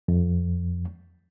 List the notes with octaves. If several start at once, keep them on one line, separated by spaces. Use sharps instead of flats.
F2